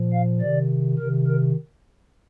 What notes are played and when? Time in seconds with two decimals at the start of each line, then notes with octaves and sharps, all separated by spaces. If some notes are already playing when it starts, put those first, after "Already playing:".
Already playing: A#2 F3
0.13 F5
0.41 C3 D#3 D5
0.98 C3 D#3 A#4
1.27 A#4